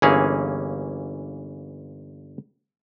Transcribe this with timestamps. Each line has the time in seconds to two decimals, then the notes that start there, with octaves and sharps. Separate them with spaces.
0.02 G1 E3 A#3 C#4 G#4